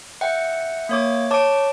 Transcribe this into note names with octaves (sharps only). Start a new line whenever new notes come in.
E5 F#5 G5
A#3 C#5 D6
C#5 A5 D6 D7